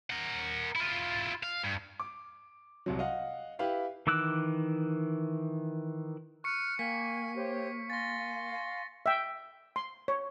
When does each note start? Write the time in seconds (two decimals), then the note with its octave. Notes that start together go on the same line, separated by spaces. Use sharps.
0.10 A#4 F#5
0.76 E4 F4
1.43 F5
1.63 G2
2.00 D6
2.86 C2 C3 F#3
2.99 D#5 F5 F#5
3.59 E4 G4 B4 F5 G5
4.07 D#3 E3 D6 E6 F#6
6.44 C#6 F6 F#6 C#7
6.79 A#3 G5 G#5 B6
7.35 G4 C5 C#5
7.90 F5 G#5 C6 A6 A#6
9.06 E5 G5
9.76 C6
10.08 C#5